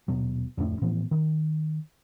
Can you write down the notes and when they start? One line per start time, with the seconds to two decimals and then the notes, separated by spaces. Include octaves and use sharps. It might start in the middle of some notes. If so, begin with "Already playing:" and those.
0.08 D#1 B2 F#3
0.57 D1 F2 A2 D4
0.81 A2 E3 F3 B3
1.11 D#3